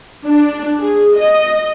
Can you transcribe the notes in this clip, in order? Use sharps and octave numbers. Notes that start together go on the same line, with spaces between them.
D4
G#4
D#5